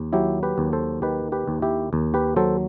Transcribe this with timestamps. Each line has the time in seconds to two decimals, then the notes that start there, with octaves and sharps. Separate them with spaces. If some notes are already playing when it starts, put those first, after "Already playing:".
Already playing: D#2
0.13 F#3 E4 G4
0.43 G4 B4
0.58 D#2
0.73 A4 C5
1.02 D#3 G4 B4
1.32 G4 B4
1.48 D#2
1.62 E4 G4
1.93 D#2
2.14 G4 B4
2.36 F#3 A4 C5